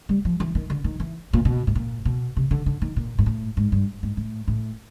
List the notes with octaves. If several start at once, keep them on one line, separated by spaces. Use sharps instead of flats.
G3
F3
E3
D#3
D3
D#3
E3
A#2
B2
A2
A#2
B2
C3
D3
D3
D#3
A#2
G#2
A2
G#2
G2
G#2
A2
A2